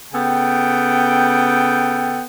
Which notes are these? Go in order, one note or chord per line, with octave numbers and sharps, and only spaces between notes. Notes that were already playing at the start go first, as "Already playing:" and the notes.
C#3 B3 A4 G5